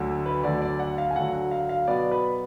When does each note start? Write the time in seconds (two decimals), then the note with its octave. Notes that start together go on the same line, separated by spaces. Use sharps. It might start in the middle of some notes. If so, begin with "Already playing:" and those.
Already playing: D2 D3 F#3
0.26 B4
0.44 D2 D3 F#3 D5
0.62 D5
0.79 F#5
0.98 F5
1.11 G#5
1.16 D2 D3 F#3 F#5
1.33 F#5
1.51 F5
1.69 F5
1.88 B2 F#3 B3 D5
2.11 B4